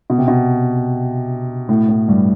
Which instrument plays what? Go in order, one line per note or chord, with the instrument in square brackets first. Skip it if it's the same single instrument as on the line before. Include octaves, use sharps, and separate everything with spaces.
[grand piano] B2
C3
B2
A2
A2
G2